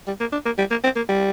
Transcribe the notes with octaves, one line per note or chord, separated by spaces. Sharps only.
G3
A#3
D4
A#3
G3
A#3
C4
A#3
G3